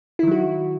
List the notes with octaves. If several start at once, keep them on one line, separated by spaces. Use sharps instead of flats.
D#3 F#3 E4 F#4